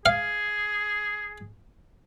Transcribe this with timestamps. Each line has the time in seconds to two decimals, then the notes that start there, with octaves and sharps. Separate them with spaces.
0.06 G#4 F5